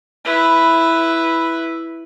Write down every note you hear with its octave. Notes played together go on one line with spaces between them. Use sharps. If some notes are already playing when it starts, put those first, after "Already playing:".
E4 B4